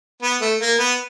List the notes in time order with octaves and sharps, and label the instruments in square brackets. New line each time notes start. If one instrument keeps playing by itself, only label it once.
[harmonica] B3
A3
A#3
B3